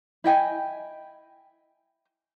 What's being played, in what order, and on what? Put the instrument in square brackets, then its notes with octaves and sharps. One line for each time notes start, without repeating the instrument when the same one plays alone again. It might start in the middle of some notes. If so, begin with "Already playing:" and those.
[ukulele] E4 D#5 G5 G#5